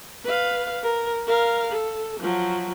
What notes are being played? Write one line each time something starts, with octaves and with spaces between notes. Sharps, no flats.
B4 F5
A#4
A#4 F5
A4
F3 F#3